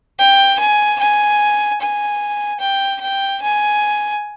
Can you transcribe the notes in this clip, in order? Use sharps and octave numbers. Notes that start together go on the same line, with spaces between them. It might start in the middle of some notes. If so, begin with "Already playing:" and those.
G5
G#5
G#5
G#5
G5
G5
G#5